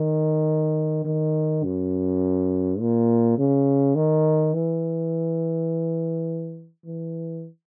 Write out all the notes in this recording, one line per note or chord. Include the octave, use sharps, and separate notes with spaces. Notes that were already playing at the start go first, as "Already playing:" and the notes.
Already playing: D#3
D#3
F#2
A#2
C#3
D#3
E3
E3